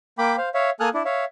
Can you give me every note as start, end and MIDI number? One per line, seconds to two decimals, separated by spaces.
0.18 0.36 58
0.18 0.36 79
0.18 0.36 83
0.18 0.36 86
0.38 0.49 72
0.38 0.49 77
0.54 0.70 73
0.54 0.70 76
0.54 0.70 77
0.80 0.89 58
0.80 0.89 69
0.80 0.89 80
0.80 0.89 87
0.80 0.89 89
0.80 0.89 90
0.94 1.03 62
0.94 1.03 64
1.05 1.25 73
1.05 1.25 76
1.05 1.25 77